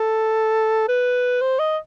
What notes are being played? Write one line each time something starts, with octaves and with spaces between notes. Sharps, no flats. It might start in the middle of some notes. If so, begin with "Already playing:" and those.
Already playing: A4
B4
C5
D#5